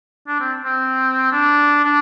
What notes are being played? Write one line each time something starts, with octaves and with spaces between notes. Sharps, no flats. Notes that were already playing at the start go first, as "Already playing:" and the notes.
D4
C4
C4
D4
D4